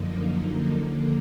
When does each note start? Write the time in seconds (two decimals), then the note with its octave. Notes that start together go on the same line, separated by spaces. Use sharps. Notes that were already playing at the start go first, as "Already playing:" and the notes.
Already playing: F#2 D3 F3 A#3 D#4
0.77 D#2 D3 F3 A#3